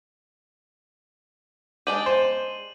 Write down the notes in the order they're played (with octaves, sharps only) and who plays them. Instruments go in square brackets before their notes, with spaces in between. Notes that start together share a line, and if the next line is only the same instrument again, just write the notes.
[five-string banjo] G#3 D4 G4 [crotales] D#7 F#7
[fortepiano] C5